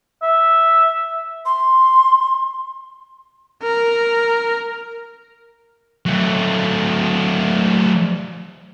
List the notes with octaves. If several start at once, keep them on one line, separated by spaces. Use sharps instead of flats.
E5
C6
A#4
F#3 A3